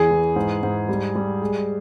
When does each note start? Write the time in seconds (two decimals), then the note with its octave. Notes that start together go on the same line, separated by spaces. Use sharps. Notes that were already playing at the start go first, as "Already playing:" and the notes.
Already playing: E2 G#4
0.11 E3
0.36 G#2
0.63 G#2
0.89 G3
1.16 G3
1.42 G#3